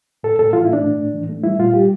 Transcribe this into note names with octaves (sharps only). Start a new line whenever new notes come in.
A2 A4
A2 A4
E3 F4
E4
A3 D4
A2
A2
E3
A3
G3 E4
A#2 F4
G3 G4